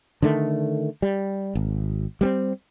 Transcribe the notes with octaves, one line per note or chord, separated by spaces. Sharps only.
D3 D#3 A3
G3
G#1
G3 B3 C4